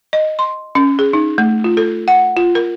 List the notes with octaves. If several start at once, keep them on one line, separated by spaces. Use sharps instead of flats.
D#5
C6
C#4
G#4
D#4
A3
F4
A4
F#5
F4
A#4